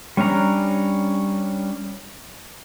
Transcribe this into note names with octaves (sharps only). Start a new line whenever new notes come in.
G3 C#4 D4 A#5